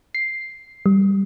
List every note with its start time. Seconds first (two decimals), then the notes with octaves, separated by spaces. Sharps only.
0.15 C7
0.86 G3